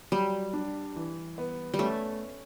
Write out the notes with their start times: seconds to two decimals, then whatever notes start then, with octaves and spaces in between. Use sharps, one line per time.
0.12 F#3 G3
0.53 D4
0.96 E3
1.38 B3
1.74 G3
1.79 A3 C#4